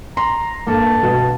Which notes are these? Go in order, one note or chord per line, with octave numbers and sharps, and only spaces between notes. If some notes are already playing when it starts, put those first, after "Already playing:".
A#5 C6
G2 A#3 A4 A5
B2 B4